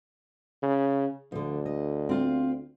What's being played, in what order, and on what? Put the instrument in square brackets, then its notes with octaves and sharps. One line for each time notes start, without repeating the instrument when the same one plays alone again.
[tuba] C#3
[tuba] D2 [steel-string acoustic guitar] D3 F3
[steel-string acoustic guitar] D#5
C4 F4 F5